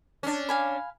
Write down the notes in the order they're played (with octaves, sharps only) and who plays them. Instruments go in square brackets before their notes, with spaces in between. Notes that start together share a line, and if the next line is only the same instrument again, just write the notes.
[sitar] C#4 D4
[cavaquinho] F5 G#5 B5